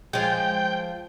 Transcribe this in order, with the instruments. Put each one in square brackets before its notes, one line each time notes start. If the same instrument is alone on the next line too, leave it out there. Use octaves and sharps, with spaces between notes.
[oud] F3 G#3 [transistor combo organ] G5